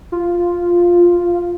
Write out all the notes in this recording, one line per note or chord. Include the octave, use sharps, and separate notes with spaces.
F4